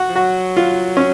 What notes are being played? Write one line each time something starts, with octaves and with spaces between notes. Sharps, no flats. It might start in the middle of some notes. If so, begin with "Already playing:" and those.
Already playing: F#4
F3
F#3 F#4
F4
C#4